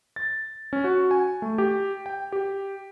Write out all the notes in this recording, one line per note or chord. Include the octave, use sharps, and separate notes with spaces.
A6
C#4
F#4
G#5
A3
G4
G5
G4